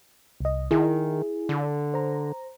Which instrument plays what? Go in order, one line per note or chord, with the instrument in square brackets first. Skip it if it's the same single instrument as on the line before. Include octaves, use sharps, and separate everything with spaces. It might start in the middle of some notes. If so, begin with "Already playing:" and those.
[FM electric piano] C2 D#5
[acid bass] D#3 [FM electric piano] E4 G#4
[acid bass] D3
[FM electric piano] C5 A#5